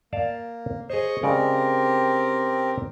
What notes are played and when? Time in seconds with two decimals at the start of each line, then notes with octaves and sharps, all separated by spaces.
0.13 A#3 D5 F5 A5
0.90 G#4 C5 C#5 D#5 C#6
1.23 C#3 G#3 C4 G4 A#4 D5